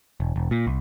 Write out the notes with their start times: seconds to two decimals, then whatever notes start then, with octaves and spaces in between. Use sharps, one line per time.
0.20 E1
0.36 E1
0.51 A#2
0.67 C2